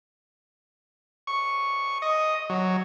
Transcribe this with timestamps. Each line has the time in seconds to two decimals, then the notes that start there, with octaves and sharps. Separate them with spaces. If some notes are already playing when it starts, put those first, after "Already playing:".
1.27 C#6
2.02 D#5
2.50 F#3